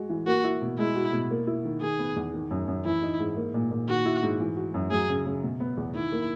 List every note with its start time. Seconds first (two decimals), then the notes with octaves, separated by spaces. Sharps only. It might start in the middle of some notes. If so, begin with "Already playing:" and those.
Already playing: G#3 F#4
0.09 E3
0.27 A#3 F#4
0.44 E4
0.62 B2
0.79 G#3 E4
0.96 F#4
1.13 B2
1.31 A#3
1.47 E4
1.65 D#3
1.81 D#3 G#4
1.99 B3
2.16 E2
2.33 D#3
2.51 F#2
2.68 F#2
2.85 E3 E4
3.02 D#4
3.20 G#2
3.36 A#3
3.54 A#2
3.71 A#2
3.88 D#3 F#4
4.06 E4
4.23 G#2
4.40 E3
4.57 F#4
4.74 F#2
4.91 F#3 G#4
5.09 C#3
5.26 C#3
5.43 B2
5.60 B3
5.77 E2
5.94 D#3 E4
6.12 A#3